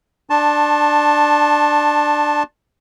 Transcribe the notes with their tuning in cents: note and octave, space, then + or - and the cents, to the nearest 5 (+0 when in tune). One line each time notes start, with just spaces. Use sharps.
D4 +15 A5 +0 C6 +45